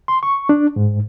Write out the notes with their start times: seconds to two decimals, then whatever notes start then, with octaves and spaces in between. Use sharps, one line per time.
0.08 C6
0.23 C#6
0.49 D4
0.76 G#2